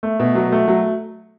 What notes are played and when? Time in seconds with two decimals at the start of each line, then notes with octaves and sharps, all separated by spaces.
0.03 A3
0.19 B2
0.35 F#3
0.52 A3
0.68 F#3